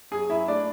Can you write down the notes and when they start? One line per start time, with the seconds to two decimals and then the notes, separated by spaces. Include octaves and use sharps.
0.11 F#2 G#4 G#5
0.30 F#2 E4 E5
0.48 A3 D4 D5